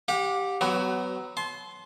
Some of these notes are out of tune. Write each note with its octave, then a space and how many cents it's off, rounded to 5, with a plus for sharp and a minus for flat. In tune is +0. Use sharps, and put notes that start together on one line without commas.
G4 +0 F#5 -45
F#3 +15 B3 +20 F#4 +35
A5 -35 C6 +5